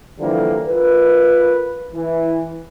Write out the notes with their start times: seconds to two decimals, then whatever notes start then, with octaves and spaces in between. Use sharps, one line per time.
0.20 D3 E3 F3 G3 A#3
0.67 F4 A#4 B4
1.93 E3